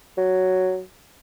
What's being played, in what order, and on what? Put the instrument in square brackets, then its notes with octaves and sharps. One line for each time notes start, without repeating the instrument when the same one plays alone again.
[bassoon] F#3